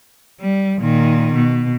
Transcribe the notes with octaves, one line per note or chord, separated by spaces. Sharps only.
G3
A#2 D#3
B2